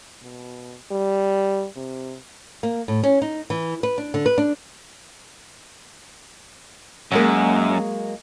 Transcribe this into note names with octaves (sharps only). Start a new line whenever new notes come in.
B2
G3
C3
A#3
A2
C#4
D#4
E3
B4
D4
D3
B4
D4
F#2 F#3 G#3 A#3